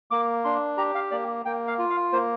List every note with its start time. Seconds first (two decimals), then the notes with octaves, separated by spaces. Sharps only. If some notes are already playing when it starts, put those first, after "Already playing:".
0.11 A#3 D6
0.44 D4 C6
0.77 G4 A#5
0.95 F5
1.11 A#3 D5
1.45 A#3 G5
1.67 F5
1.79 F4
1.90 F5
2.13 A#3 C5